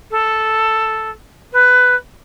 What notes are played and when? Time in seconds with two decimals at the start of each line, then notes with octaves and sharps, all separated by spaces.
0.11 A4
1.52 B4